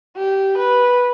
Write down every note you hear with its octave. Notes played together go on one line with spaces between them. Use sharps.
G4
B4